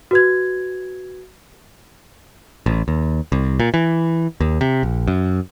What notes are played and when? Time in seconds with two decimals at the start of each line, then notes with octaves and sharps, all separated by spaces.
0.11 F#4 B4 G#6
2.66 A1
2.88 D#2
3.32 C2
3.60 A#2
3.74 E3
4.40 D#2
4.61 C3
4.83 A#1
5.08 F#2